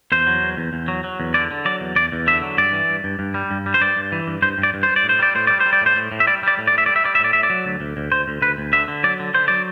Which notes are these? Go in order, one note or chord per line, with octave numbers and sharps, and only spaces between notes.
E2 C5
F#3
E2
E2
E2
F#3
F#3
E2
D3 D5
D3
F#3 D5
E2
E2 D5
E2
D3 E5
F#3
G2 D5
E3
G2
G2
G2
G3
G2
G3
C5
G2 D5
G2
E3
G2
G2 C5
G2
D5
G2
C5
G2
D5
A2
C5
G3 D5
A2 C5
G3 D5
C5
G3
D5
A2 C5
A2
A2
E5
G3 D5
G3 D5
A2
D5
A2 E5
G3 D5
E5
G3 D5
E5
A2 D5
A2 E5
D5
F#3
D2
D2
D2
D2 C5
D2
D2 B4
D2
D3 E5
D3
F#3 D5
D3
D3 C5
F#3 D5